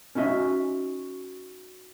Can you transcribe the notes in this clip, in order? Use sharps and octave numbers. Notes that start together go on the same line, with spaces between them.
C#4 D#4 F#4 E5 G#5